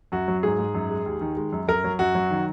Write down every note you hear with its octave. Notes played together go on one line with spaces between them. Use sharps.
F#2 F#4
F#3
G#2 G#4
G#2
F#2
G#3
D#2
D#3
G#3
F#2
F#2 A#4
F#3
F#2 F#4
F#3
D#3